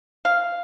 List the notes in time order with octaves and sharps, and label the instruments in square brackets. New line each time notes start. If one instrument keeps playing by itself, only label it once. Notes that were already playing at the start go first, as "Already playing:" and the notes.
[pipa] F5